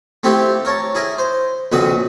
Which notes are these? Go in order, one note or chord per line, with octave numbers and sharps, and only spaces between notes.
A3 C4 E4 F4 G4
A#4 C#5 A5
E4 G#4 A#4
C5
A#1 F2 C#3 F#4 B4 D#6